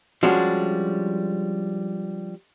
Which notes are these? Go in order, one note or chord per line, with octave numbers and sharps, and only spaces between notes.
F3 G3 G#3 C#4 D4 F#4